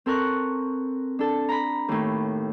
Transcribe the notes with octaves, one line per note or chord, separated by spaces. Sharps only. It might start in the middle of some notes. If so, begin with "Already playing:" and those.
C4 A4 A#4 C#6 F#6
D4 A4 A5
A#5 B5
D#2 A2